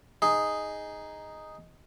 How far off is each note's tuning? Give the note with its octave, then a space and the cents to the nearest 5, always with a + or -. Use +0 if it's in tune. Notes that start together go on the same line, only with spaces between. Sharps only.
D#4 +0 G#4 +0